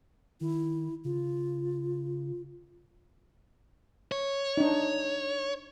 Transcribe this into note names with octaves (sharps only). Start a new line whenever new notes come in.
D#3 E4
C#3 F4
C#5
D4 D#4